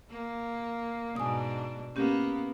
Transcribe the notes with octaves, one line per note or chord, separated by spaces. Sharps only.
A#3
G#2 B2 D4 G#5 D#6
A#3 B3 C#4 G4